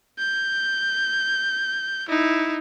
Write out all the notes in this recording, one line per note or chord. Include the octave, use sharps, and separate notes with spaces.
G6
D#4 E4